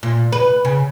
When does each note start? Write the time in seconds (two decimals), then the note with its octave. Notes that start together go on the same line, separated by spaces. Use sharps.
0.03 A#2
0.32 B4
0.65 C#3